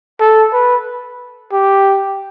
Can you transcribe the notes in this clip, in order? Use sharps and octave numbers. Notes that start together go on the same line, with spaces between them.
A4
B4
G4